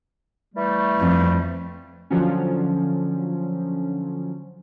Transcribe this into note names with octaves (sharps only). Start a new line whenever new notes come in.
E3 G3 A3
F2
D3 F3 F#3 C#4